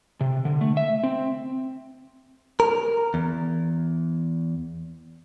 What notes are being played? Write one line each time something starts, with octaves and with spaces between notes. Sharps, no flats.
C3
D3
A3
E5
C4
A#4
E2